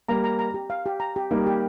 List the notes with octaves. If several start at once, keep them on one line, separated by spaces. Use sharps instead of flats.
G3 A#3 A#5
A#5
A#5
G4
F5
G4
A#5
G4
G3 A#3 D#4
G4